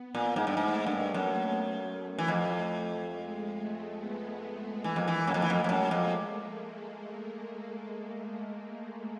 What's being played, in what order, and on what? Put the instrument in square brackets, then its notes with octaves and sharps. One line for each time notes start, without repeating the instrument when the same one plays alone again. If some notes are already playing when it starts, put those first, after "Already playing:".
Already playing: [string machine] B3
[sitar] A#2 [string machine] A#3
[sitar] G#2
G2
[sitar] G#2 [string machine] A3
[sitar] G2
[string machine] A3
[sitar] F#2
E3
F2
[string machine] G#3
A3
B3
B3
[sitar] E3 [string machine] A#3
[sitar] F2
E3
[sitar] F#2 [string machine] A3
[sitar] F2
E3
F2
F2
[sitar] F#2 [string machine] G#3
[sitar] F2